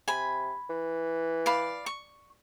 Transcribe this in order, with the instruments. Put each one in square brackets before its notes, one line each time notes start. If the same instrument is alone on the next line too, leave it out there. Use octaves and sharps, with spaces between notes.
[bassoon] C3 [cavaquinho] G#5 B5
[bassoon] E3
[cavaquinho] D5 F5 B5
C#6